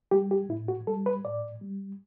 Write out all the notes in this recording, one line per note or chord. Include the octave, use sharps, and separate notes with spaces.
G3 G4
G4
A2 E4
F#4
G3 A4
B4
A2 D5
G3